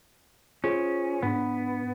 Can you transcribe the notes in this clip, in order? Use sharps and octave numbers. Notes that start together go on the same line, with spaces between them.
C#4 F4 G#4 C5
G#2 B3 D4